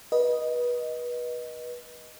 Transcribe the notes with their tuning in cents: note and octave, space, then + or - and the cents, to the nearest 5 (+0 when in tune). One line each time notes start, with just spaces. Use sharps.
B4 -25 D#5 +0